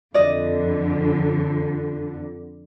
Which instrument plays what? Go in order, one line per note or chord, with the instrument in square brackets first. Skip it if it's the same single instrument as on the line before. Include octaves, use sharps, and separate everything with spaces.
[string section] F2 D3 [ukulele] D5 D#5